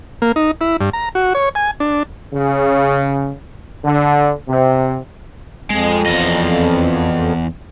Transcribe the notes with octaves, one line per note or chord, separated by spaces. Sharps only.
A#3
D#4
E4
G2
A#5
F#4
C#5
G#5
D4
C#3
D3
C3
F2 G#3
E2 D#5